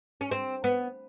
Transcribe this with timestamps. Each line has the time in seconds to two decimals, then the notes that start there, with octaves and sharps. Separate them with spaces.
0.21 C#4
0.31 C4
0.64 B3